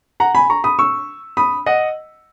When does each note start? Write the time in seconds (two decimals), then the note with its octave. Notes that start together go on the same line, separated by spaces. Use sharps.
0.20 F#5 A#5
0.35 G#5 B5
0.50 A#5 C#6
0.64 B5 D#6
0.79 C#6 E6
1.37 B5 D#6
1.66 D#5 F#5